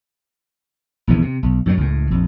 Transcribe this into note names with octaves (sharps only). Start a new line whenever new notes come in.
A#1 E2 C3 E3
C3
B1
F#2 A2 D3 F#3
C#2 A2
A#1 F2